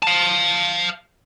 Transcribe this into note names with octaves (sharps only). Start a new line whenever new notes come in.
F5 A5